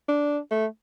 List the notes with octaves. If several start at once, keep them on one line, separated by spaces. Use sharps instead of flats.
D4
A3